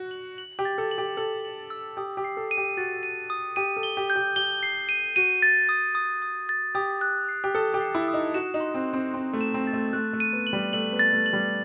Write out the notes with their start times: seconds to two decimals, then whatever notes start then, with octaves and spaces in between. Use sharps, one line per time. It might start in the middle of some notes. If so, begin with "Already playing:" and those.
Already playing: F#4
0.11 F#7
0.38 F#7
0.59 G4
0.65 A6
0.78 A4
0.91 F#7
0.98 G4
1.17 A4 F#7
1.45 F#7
1.70 E6
1.97 G4 D#6
2.17 G4
2.24 C7
2.37 A4
2.51 D#7
2.57 G4
2.77 F#4 A6
3.03 D#7
3.30 D#6
3.56 G4 D#7
3.77 A4
3.83 G7
3.97 G4
4.10 G6
4.16 G4
4.36 G4 G7
4.63 C7
4.89 D#7
5.16 F#4 D#7
5.42 A6
5.69 D#6
5.95 D#6
6.22 D#6
6.49 A6
6.75 G4 D#6
7.01 F#6
7.29 C7
7.44 G4
7.55 A4 D#6
7.74 G4
7.81 C7
7.95 E4
8.08 D#6
8.14 D#4
8.34 F#4 E7
8.54 D#4
8.60 C6
8.74 C4
8.88 C6
8.93 C4
9.14 C4 C6
9.33 A3
9.41 E7
9.54 C4
9.67 A6
9.73 A3
9.93 A3 F#6
10.13 A3
10.20 D#7
10.33 B3
10.47 F#7
10.53 G3
10.73 A3 F#7
10.93 B3
10.99 A6
11.13 A3
11.26 F#7
11.33 G3